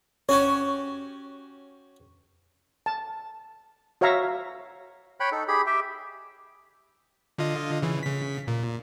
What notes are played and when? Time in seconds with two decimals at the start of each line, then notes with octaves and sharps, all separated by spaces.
0.29 C#4 F#4 G4 C#5
2.86 A5
4.01 F#4 C#5 E5 F5 A#5
5.20 C#5 G5 B5 F#6
5.32 D#4 A4
5.48 G4 G#4 B5
5.66 G4 E5 G5
7.38 D3 F4 D#5
7.82 C#3 E3
8.03 C#3 B6
8.48 A#2